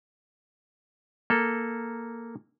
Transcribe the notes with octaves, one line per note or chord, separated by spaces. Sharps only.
A#3 A4